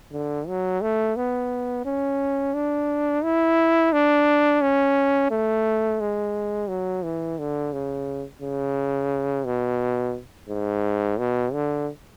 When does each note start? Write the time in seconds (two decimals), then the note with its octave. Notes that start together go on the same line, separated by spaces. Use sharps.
0.12 D3
0.48 F#3
0.81 A3
1.16 B3
1.85 C#4
2.54 D4
3.24 E4
3.93 D4
4.62 C#4
5.31 A3
6.00 G#3
6.69 F#3
7.04 E3
7.39 D3
7.73 C#3
8.42 C#3
9.46 B2
10.49 G#2
11.19 B2
11.53 D3